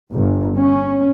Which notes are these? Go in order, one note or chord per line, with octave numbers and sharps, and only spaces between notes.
G1
C#4